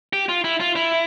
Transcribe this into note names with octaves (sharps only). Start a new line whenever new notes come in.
G4
F4
E4
F4
E4